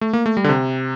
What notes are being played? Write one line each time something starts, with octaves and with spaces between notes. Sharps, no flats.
A3
A#3
A3
G3
D3
C3